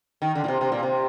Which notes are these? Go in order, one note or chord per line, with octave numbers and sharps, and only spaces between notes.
D#3
D3
A#2
C3
C3
A#2
C3